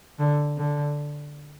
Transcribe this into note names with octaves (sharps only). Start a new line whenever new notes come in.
D3
D3